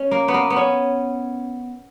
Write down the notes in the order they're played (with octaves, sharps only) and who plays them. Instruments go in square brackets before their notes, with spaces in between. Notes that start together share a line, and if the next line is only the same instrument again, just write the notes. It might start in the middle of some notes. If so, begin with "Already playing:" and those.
Already playing: [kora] C#4
A#3
B3
A#3
B3
C#4